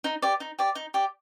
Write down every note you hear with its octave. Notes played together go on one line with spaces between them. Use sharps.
D#4
G4 D5
D#4
G4 D5
D#4
G4 D5